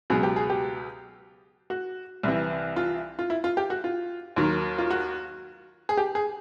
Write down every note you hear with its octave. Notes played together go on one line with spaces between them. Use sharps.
C#2 B2 F#3 G#4
G4
G#4
G4
F#4
C2 C3 E3
F4
F4
E4
F4
G4
F#4
F4
D#2 D#3 F#3
F4
F#4
G#4
G4
G#4